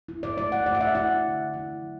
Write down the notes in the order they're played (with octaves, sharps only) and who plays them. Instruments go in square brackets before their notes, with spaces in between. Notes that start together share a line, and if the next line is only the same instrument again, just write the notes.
[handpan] E4
D5
A3 D5
F#5
A3 D5
F#5
E5
E4 F#5
D3
E4
F#3